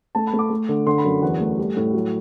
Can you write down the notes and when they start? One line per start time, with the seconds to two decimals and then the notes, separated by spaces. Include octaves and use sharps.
0.15 A3 A5
0.27 B5
0.33 A3
0.39 D6
0.50 A3
0.69 D3
0.86 D3 C6
0.98 B5
1.05 F#2
1.22 E2 F#5
1.40 A3
1.58 G3
1.77 A2
1.94 F#3